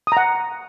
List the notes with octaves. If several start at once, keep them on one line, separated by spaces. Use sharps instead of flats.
F#5 A#5 D#6